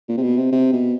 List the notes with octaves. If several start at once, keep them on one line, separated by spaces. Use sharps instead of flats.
A#2
C3
B2
C3
C3
B2